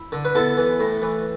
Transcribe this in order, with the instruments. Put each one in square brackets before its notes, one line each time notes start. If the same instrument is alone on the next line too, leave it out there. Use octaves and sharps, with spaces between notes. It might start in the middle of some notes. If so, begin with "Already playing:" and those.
Already playing: [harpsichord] E4
D3
B4
B3 E4 A4
E3
A2
E3